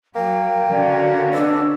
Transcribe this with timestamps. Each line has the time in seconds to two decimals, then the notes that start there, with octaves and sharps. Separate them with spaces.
0.16 F#3 A#3 A#4 G5
0.71 D3 C#4 F#4 D5
1.34 B2 D4 E6